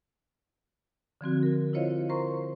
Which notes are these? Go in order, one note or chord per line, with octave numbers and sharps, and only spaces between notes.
D3 F3 C4 F#4
A#4
E4 F4 C5 C#5 D#5 F5
A#4 C5 A#5 C6 C#6